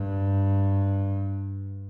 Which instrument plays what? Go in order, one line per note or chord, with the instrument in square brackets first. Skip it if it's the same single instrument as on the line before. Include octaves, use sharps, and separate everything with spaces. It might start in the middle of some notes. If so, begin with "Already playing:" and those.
Already playing: [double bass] G2